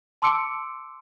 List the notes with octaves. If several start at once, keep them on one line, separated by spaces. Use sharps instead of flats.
A5 C6 D6 E6 C#7 D7